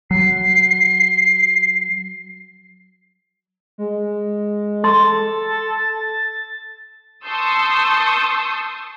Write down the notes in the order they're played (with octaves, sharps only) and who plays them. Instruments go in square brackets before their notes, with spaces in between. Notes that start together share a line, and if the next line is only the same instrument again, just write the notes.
[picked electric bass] F#3 [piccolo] C7
[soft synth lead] G#3
[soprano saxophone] A4 [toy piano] C6 [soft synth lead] A6
[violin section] A5 C6 C#6 D#6 E6 G6